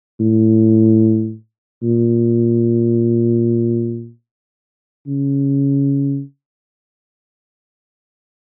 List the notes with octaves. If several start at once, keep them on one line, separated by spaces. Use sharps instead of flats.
A2
A#2
C#3